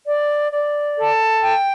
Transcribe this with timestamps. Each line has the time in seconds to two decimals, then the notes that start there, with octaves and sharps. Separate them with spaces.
0.06 D5
0.52 D5
0.97 A4
1.41 G5